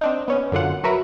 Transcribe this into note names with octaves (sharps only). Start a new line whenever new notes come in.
C4 D4 D#4
B3 C#4
F#2 D3 F4 F#5
F#3 F#4 A#4 B4 E5